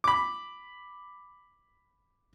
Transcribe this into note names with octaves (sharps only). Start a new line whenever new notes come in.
B5 D6